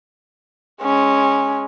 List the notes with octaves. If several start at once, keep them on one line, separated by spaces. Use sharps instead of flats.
G#3 C#4